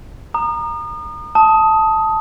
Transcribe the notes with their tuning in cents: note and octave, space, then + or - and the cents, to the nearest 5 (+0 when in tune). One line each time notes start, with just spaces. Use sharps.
A#5 +0 D#6 -35
A5 +0 D#6 +15